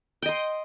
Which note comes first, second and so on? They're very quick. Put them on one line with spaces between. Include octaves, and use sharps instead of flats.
G5 D#5 C6